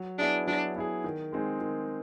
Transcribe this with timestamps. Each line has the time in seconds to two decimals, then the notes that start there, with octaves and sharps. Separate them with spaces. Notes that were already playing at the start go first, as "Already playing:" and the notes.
Already playing: F#3
0.18 B3 D4 E4 G#4
0.47 F#3 D4
0.76 B3 E4 G#4
1.04 D#3
1.32 G#3 C4 D#4 G#4
1.61 D#3